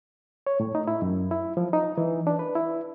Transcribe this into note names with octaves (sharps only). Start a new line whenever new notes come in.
C#5
A2
D#4
E4
F#2
E4
F3
D#4
E3
D4
B4
E4